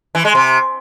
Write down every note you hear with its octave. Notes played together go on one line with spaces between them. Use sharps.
E3
G#3
C3